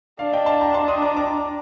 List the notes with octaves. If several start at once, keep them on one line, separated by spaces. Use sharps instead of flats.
D4 D5 F5
D#5 G5
F5 A5
G5 A#5
A5 C6
C6 D#6
A#5 D6
A#5 D6